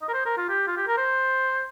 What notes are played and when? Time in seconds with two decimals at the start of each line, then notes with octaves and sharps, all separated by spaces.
0.02 D#5
0.08 A#4
0.14 C5
0.26 A#4
0.38 F4
0.49 G4
0.68 F4
0.77 G4
0.87 A#4
0.98 C5